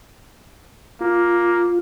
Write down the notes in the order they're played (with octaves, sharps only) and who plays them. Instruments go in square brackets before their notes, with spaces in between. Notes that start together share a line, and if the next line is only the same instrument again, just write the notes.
[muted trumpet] A#3 [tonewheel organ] F4